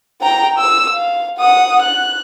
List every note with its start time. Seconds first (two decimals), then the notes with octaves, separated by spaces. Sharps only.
0.22 G5 A#5
0.59 E6
0.94 F5
1.38 F#5 D#6
1.82 F#6